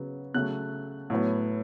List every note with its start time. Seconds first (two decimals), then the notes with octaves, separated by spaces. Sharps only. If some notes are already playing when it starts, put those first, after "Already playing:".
Already playing: C#3 F#3 B3
0.34 C#3 F#3 A3 F#6
1.10 A2 F#3 B3